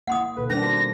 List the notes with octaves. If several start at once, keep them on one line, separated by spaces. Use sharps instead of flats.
A#3 E4 F#5 C6 D#6
B2 D#3 A4 B4
G3 C#4 D4 A#4 C5 A#6
F#4